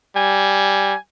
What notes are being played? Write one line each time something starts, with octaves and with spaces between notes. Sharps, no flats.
G3 G#5